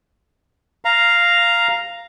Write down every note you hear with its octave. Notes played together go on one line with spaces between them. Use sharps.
F5 A#5